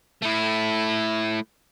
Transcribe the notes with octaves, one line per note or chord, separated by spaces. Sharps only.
A3 E4